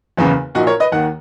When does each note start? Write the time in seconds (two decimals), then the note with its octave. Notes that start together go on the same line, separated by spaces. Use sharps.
0.17 F#1 E2 C#3 E3
0.55 A#1 A#2 D#4 F#4
0.67 A#4 C#5
0.80 B4 D#5
0.92 D#2 D#3 F#5